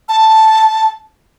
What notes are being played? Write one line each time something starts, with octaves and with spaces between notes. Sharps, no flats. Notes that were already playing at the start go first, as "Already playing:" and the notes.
A5